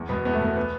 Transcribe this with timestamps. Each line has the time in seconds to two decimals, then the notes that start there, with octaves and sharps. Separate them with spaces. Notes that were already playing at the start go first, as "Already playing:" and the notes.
Already playing: E2
0.09 B2 B3
0.25 E2 B3
0.33 A3
0.41 B2 B3
0.57 B3